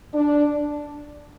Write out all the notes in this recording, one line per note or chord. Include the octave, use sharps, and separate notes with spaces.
D4